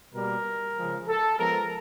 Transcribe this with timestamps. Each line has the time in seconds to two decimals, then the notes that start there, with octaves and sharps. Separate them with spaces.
0.14 B2 G3 A#3 A#4
0.76 C#3 F3 G#3
1.08 A4
1.39 F3 G#3 B3 A#4